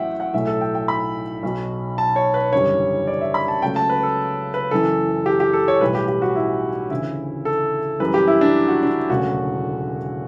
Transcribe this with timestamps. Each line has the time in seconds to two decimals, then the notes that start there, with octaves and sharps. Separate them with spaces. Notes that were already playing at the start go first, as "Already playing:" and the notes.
Already playing: A1 A2 F#3 E5 F#5 G5
0.20 F#5
0.34 B1 A2 F#3 A3 E5
0.47 A4
0.61 G5
0.75 G5
0.88 B5
1.43 B1 B2 F#3
1.98 A5
2.16 C#5
2.34 B4
2.52 F#1 E2 D3 G3 C#5
3.07 D5
3.21 E5
3.34 B5
3.48 A5
3.62 C#2 C#3 F#3 A3 G5
3.76 A5
3.90 B4
4.03 A4
4.54 B4
4.71 F#1 F#2 E3 A4
5.26 G4
5.40 G4
5.53 A4
5.68 C#5
5.81 B1 A2 E3 G3 B4
5.95 G4
6.08 G4
6.22 F#4
6.36 E4
6.90 D2 C#3 E3 E4
7.45 A4
8.00 F#2 E3 G3 B4
8.14 G4
8.27 E4
8.41 D4
8.68 F#4
8.83 D4
9.09 E1 D2 C#3 F#3 A3 F#4